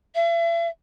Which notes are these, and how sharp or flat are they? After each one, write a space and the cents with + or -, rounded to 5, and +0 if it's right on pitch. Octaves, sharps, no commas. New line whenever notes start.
E5 +40